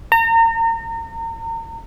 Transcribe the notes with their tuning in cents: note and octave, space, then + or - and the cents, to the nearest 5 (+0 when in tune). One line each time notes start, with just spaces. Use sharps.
A#5 -35